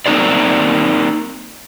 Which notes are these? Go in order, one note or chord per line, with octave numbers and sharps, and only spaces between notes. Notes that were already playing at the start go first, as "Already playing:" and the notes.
A#3 C4 D#4 G#4 C5 D5